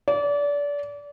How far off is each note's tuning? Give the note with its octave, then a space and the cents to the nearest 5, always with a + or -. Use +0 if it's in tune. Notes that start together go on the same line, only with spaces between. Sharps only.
D5 -30